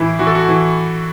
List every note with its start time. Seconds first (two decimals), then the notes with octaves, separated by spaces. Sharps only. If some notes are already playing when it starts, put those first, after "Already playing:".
Already playing: A2 E3 E4
0.19 E3 F#4
0.27 A4
0.35 F#4
0.49 E3